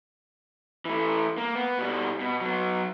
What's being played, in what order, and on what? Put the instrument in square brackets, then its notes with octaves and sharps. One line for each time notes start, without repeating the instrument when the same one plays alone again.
[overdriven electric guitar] E3 A3
A#3
B3
B2 G3
B2
F#3 B3